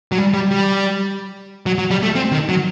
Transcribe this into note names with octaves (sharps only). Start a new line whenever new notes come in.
F#3
G3
G3
G3
F#3
F#3
G3
A3
C4
D#3
F#3